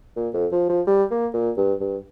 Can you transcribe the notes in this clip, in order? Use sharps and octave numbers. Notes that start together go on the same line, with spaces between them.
A#2
F2
F3
F3
G3
A#3
A#2
G2
G2